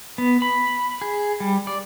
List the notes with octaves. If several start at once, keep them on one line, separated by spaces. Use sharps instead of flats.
B3
B5
G#4
G3
D5